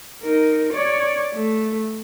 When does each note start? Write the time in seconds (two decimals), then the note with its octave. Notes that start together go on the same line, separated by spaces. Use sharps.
0.23 D#4 A#4
0.73 C#5 D5
1.35 A3